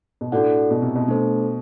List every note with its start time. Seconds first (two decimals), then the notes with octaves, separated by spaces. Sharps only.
0.21 B2
0.32 A2 D4 F#4 A4 D5 F#5
0.71 B2
0.82 C3
0.96 B2
1.08 A3 D4 A4 C5